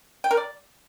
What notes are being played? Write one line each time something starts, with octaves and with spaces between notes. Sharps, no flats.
G5
A#4
D5